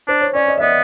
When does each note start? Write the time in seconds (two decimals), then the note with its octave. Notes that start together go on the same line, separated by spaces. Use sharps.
0.08 D4 C5
0.21 C#5
0.35 C#4 D5
0.48 D#5
0.58 E5
0.61 B3 D#5